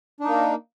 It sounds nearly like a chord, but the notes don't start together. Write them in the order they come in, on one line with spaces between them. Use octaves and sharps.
D4 D#4 A#3